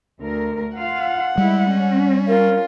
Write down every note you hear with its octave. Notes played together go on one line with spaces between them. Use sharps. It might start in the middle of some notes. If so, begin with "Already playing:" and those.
D2 A#4
F4 F5 F#5
G3 G#3 E4
C#4
F4 A#4